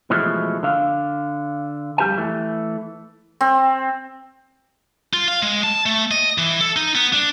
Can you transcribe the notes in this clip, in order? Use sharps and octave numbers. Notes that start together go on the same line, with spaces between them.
B2 E3 F3 G#3 A3
D3 F5
F2 G3 G4 B4 G#5
E3 A3
C4
F4
F5
G#3
A5
A3
D#5
E3
A4
D#4
B3
D4